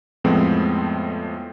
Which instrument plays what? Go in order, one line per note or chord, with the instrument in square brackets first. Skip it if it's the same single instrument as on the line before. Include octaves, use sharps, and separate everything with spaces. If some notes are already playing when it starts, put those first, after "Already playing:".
[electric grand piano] F2 A2 F3 G#3 B3 C4